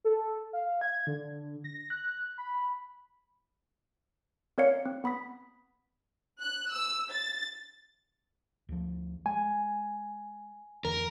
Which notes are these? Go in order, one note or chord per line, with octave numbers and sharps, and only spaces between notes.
A4
F5
G#6
D3
A#6
F#6
B5
C4 A#4 C#5 D5 F5 C#7
C4
B3 B5 D#6 B6
F#6
E6
A6
D2 F3
G#3 G#5
F2 D3 E3 A#4